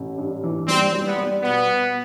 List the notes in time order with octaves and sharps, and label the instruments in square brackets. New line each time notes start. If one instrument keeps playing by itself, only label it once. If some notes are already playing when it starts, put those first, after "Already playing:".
Already playing: [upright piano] A1
G2
E3
[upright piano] G3 [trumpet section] C4
[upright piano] G3
[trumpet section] B3
[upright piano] G3
[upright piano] B2 [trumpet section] B3
[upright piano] B2